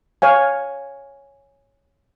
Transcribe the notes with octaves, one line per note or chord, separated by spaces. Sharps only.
C#5 F5 G#5